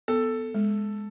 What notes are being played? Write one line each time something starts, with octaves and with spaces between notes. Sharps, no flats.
B3 A4
G#3